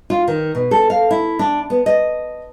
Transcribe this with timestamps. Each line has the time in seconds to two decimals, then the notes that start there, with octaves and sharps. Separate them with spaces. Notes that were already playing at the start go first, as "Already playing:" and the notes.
0.10 F4
0.28 D#3
0.55 B2
0.71 A4
0.90 F5
1.11 E4
1.39 D4
1.70 B3
1.86 D#5